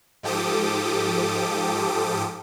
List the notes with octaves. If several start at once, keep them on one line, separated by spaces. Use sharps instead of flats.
G#2 F3 G4 A4 D6 D#6